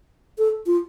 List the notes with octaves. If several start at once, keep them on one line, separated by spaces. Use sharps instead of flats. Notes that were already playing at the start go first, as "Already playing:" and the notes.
A4
F4